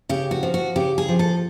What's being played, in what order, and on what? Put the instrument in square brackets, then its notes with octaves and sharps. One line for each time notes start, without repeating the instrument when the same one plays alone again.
[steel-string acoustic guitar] C#3 G4
F#4
F3
F#4
C#3 G4
G#4
F3
A4